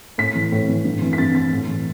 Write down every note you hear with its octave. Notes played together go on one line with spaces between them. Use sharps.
A2 B6
E3
A2
E3
G2
E3
B6
G2 A6
E3 A6
A2
E3